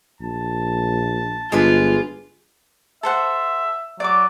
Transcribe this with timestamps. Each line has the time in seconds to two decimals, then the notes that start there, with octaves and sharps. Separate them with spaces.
0.21 A#1 A5
1.52 G1 G#3 D4 F4 B4
3.03 A4 C5 E5 F#5
4.00 F#3 D5 D6